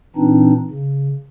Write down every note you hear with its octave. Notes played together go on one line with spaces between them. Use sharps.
A#2 E3 C4 D4 D#4
C#3